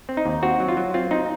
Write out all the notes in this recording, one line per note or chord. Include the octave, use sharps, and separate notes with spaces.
C4
D#4
D#2
C4 F#4
F#3
F4
F#3
C4 F4
C4 D#4